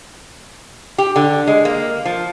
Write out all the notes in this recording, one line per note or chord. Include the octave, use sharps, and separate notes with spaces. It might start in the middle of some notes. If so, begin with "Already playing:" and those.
G4
D3
G#3
A#3
F3